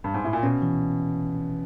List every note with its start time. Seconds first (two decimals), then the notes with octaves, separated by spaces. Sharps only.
0.04 G2
0.14 G#2
0.24 A2
0.33 A#2
0.43 B2 C#4
0.62 E3